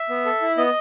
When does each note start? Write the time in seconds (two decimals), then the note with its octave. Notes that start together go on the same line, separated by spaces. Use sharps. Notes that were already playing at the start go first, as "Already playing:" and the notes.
Already playing: E5
0.10 B3
0.25 A4
0.42 E4
0.57 B3 D#5